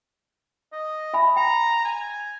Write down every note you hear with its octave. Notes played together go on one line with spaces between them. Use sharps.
D#5
E5 G#5 B5
G5 A#5
G#5